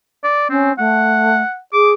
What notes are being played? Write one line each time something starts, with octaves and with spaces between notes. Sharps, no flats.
D5
C4 C#4
A3 F#5
G#4 D6